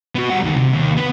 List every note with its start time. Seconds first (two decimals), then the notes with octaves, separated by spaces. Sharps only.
0.15 B3 F#4
0.30 G3 F#5
0.44 D2 D#3
0.56 C3
0.74 D#2
0.97 B3 B4